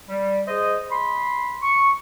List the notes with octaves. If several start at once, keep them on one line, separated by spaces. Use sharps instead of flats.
G3
G#4 C5 D#5
B5 C6
C#6